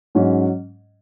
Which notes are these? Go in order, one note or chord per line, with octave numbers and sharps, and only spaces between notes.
G#2 F#3 C#4